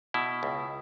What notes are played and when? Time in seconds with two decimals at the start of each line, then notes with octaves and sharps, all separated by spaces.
0.14 B2 E4
0.43 C#2